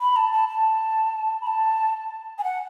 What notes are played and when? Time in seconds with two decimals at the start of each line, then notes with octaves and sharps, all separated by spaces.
0.01 B5
0.16 A5
0.32 A5
0.49 A5
1.41 B5
1.47 A5
2.38 G#5
2.44 F#5